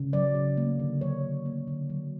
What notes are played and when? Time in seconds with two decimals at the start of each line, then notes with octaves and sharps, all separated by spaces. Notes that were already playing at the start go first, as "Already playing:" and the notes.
Already playing: C#3
0.13 F#3 D5
0.35 C#3
0.57 A#3
0.79 D3
1.01 F#3 C#5
1.23 D3
1.46 A#3
1.67 D3
1.90 F#3